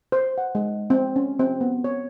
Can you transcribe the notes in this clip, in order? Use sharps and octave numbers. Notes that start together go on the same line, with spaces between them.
C5
F#5
G#3
C4
C#4
C4
B3
C#5